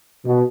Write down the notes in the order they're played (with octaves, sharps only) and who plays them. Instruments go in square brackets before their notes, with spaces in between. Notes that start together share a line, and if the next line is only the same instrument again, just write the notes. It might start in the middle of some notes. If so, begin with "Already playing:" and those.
[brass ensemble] B2